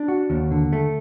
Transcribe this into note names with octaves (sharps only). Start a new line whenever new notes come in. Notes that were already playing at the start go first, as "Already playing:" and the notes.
Already playing: D4
F#4
D#2
D3
A3